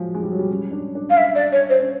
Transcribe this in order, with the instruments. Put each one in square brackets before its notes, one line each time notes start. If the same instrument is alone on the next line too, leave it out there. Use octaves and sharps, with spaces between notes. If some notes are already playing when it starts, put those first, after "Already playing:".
Already playing: [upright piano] F3 F#3 G#3
G#3
G3
F#3
G3
C#4
D4
D4
[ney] F5
E5
D5
C#5
C5
[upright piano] C#4